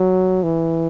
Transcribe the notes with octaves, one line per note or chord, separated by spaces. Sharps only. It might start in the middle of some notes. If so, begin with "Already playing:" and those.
Already playing: F#3
E3